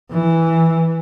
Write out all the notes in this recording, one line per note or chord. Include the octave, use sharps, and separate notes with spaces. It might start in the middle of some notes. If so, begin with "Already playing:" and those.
E3